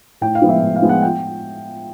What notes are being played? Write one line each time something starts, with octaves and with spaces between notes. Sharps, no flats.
A2 G5
F5
F3 G#3 B3
E5
A2
F5
F3 G#3 B3
F#5
G5